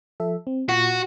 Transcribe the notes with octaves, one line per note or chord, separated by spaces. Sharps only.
F3 A4 E5
C4
A#2 F4 F#4